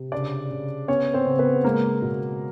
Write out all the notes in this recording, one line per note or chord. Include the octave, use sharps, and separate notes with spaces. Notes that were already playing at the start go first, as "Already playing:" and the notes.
Already playing: C3
C#3 D4 D5
C#3
B3 C#4 C#5
C4 C5
C#3
B3 B4
G#3 A#3 A#4
B2